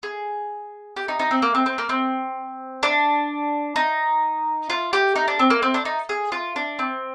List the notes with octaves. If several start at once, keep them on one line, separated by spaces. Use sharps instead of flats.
G#4
G4
D#4
D#4
C4
A#3
C4
C4
A#3
C4
D4
D#4
F4
G4
D#4
D4
C4
A#3
C4
D4
D#4
G#4
F4
D4
C4